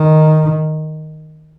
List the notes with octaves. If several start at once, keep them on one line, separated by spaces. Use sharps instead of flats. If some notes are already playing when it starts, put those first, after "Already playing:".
Already playing: D#3